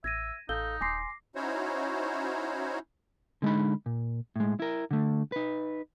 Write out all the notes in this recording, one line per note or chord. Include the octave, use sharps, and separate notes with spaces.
A1 E5 G#6 A#6 D#7
A1 D#4 A4 F5 E6 G6 G7
D#1 G#5 C6 D6 A#6 C7
C#4 D#4 E4 F#4 C5 C#5
D3 G#3 D#4 B5
A#2
A2 G#3
E4 A#4
D3 A3
D#4 B4